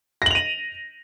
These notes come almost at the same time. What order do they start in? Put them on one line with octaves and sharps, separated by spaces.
A#6 F#7 F7 D#7